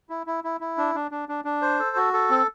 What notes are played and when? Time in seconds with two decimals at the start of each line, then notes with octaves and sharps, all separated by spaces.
0.10 E4
0.27 E4
0.44 E4
0.61 E4
0.78 D4
0.95 D4
1.11 D4
1.29 D4
1.45 D4
1.62 C5
1.79 A4
1.96 F#4
2.13 A4
2.30 C4